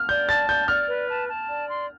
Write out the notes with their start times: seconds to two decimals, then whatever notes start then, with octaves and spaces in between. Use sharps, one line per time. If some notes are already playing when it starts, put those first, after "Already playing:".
Already playing: F6
0.09 D5 G6
0.28 A5 A6
0.49 D5 G6
0.68 D5 F6
0.88 B4
1.09 A5
1.29 A5
1.49 D5
1.69 C6